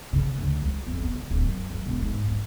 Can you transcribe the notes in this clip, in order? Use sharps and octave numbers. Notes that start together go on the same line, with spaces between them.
C#3
D2
C#2
F2
B3
C#2
D1
F#2
F#2
E1
G#2
G#2